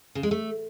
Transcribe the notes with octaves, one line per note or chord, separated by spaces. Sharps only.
C#3
G#3
A3